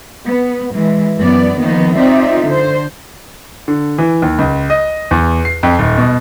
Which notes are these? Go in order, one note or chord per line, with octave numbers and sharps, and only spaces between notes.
B3
E3 G#3
F#2 E3 B3 D5
D#3 F3 A#3 B3 D#4
C4 D#4 F4 D5 E5
D3 C5
D3
E3
D#2
C#2
D#5
E2
C7
F2
D#1
B2